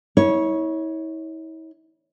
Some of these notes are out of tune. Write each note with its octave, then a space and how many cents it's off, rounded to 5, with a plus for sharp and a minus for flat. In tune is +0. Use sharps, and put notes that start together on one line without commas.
E4 -40 C#5 +0